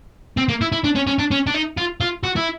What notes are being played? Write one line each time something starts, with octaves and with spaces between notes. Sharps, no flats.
C4
A#3
E4
E4
D4
C#4
C#4
D4
C#4
D4
D#4
F4
F4
F#4
E4